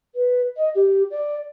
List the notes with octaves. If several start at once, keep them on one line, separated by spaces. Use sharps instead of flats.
B4
D#5
G4
D5